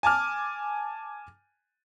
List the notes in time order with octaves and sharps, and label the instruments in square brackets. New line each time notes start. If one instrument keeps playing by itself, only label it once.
[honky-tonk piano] G#5 A5 D6 F6